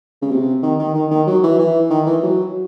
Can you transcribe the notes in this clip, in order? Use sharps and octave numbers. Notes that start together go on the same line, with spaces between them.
C#3
C3
D#3
D#3
D#3
D#3
F#3
E3
E3
D#3
E3
F#3